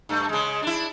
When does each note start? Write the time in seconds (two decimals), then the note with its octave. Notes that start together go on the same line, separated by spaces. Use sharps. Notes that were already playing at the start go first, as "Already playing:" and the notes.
0.09 G2 A3
0.29 C#3 G#3
0.63 D4 E4